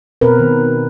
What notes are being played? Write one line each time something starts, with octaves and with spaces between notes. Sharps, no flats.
B2 B3 C4 A#4 B4
D#3